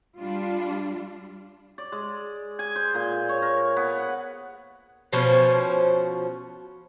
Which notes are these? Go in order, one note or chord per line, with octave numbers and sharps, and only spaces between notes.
G3 D4 F4
D5
G#3
G#5
C5
A#2
C#5
A#4
B3
F#5
B2 F3 C#4 C5